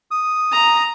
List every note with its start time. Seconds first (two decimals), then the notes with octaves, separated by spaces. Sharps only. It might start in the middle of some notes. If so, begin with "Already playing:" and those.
0.11 D#6
0.52 A#5